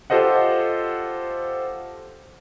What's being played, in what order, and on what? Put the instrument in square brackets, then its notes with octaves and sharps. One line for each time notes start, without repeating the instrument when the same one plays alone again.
[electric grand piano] F4 G4 A4 C5 D#5 F#5